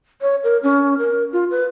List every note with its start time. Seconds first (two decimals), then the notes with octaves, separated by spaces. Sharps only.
0.22 C#5
0.44 A#4
0.63 C#4
0.98 A#4
1.33 F4
1.50 B4